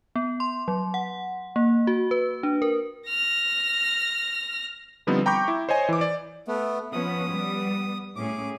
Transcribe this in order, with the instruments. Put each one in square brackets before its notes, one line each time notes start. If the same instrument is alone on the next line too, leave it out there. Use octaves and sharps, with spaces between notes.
[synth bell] B3
C6
F#3
F#5
A#3
F#4
B4
D4
A#4
[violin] F6 A#6
[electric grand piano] D3 F3 G3 B3 C4 D#4
G5 A#5 B5 C#6 D6 G6
E4
C5 C#5 D#5 G#5
E3 D6
D5
[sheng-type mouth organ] A3 B3
[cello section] F3 B3 C#4 [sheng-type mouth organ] D#6
[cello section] G3 B3
[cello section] A2 C#4 G#4 [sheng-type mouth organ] D6